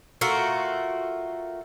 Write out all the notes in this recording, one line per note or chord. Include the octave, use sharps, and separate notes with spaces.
A3 F4 F#4 A#4